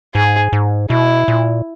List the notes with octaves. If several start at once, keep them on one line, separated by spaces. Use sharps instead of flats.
G#2 G#4
G#2
B2 E4
A#2